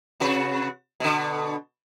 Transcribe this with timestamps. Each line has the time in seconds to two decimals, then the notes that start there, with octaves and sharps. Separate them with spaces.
0.20 C3 F#4 B4
1.00 B2 D3